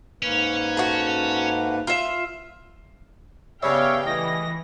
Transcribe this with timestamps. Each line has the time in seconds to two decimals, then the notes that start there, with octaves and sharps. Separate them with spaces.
0.22 G#2 A#3 C#4 B4
0.77 A3 F#4
1.87 F4 E5
3.63 G2 C#3 G3 B3 C#5 E5 F5 G5
4.06 E3 A3 D#5 A#6